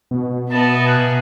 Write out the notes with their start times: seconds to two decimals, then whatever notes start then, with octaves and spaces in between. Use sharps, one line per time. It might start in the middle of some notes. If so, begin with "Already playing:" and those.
0.11 B2
0.51 B3 D#5 E5 A5
0.86 A#3 G#4 F#5